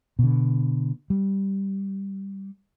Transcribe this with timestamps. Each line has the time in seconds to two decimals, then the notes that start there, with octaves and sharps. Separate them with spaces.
0.19 B2 D3
1.10 G3